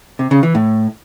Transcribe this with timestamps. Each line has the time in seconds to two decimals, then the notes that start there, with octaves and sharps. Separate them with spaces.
0.19 C3
0.31 C#3
0.43 E3
0.55 A2